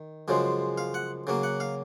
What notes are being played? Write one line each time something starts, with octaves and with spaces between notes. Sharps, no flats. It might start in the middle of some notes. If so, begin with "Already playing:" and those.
Already playing: D#3
F#2 C#3 F3 G#3
F5
F#5
C#3 F#3 A#3
F#5
F5